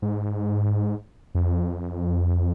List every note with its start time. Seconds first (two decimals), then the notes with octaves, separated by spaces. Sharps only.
0.02 G#2
1.35 F2